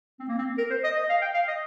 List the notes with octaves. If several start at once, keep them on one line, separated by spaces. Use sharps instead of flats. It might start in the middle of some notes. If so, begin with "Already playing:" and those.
C4
A#3
C4
A#4
C5
D#5
D#5
F5
G5
F5
D#5